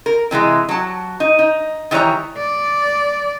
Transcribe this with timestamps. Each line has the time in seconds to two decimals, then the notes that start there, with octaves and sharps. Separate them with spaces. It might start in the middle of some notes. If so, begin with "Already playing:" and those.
0.06 A#4
0.31 C3 E3 F#3 G#3
0.69 F#3 A5
1.20 D#4
1.39 D#4
1.91 D#3 E3 G3 C#5 A#5
2.38 D5